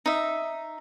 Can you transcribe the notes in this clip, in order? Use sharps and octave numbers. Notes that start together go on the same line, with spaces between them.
D#4 E5